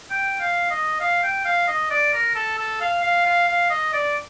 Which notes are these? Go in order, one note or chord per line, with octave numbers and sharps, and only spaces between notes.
G5
F5
D#5
F5
G5
F5
D#5
D5
A#4
A4
A4
F5
F5
F5
F5
D#5
D5